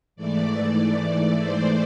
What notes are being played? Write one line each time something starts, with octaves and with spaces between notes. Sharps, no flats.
G#2 E3 A3 D5
D5
C5